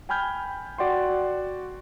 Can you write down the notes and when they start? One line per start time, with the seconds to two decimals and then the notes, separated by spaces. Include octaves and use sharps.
0.09 G5 G#5 B5 F6 G6 G#6
0.78 F#4 D5 F#5 G5 C6